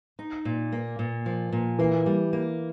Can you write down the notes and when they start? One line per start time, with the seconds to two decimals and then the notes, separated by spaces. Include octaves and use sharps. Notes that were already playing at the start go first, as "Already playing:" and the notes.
0.19 D#4
0.45 A#2
0.72 A#3
0.99 A#2
1.26 F3
1.52 A#2
1.79 E3 A#3
2.06 G3
2.33 A#3